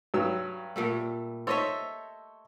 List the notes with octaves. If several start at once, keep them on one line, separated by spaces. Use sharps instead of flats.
G2 F#3 E6
A#2 G3 A3
A4 C5 C#5 D#5 E5